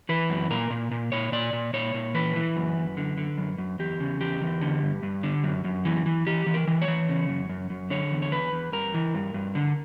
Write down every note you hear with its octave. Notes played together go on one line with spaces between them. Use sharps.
E3 B4
F#2
A#2 A#4
A#2
A#2
A#2 C#5
A#2 D5
A#2
A#2 C#5
A#2
E3 B4
E3
F#2
F#2
D3
D3
F#2
F#2
E2 G4
C#3
E2 G4
E2
D3
G2
G2
D3
F#2
F#2
E3
E3
E3 G4
E3
A#4
E3
C#5
E3
C#3
F#2
F#2
F#2
D3 C#5
E2
C#5
E2 B4
E2
G2 A#4
E3
G2
G2
D3